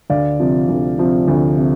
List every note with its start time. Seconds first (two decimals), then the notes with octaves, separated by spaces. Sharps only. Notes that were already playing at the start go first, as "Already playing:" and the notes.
0.10 D2 D5 F5
0.40 C3 F3
0.69 D2
0.98 C3 F3
1.28 D2
1.57 C3